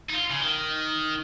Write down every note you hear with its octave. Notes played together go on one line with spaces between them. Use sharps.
D#4
F4
C#3
D#3